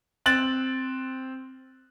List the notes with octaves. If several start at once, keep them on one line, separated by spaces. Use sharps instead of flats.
C4 F#6 A6 F#7